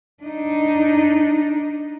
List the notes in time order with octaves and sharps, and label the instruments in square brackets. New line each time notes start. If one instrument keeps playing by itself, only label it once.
[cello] D4 D#4